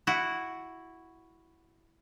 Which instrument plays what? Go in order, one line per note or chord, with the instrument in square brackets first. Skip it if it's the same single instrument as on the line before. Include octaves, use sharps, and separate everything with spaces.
[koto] E4 F#4